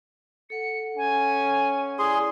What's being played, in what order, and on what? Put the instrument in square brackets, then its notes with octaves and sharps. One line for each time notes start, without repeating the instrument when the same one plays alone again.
[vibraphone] A4 F#5 [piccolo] C#7
[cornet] C#4 [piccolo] G#5
[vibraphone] E4 D5 [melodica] G#4 C6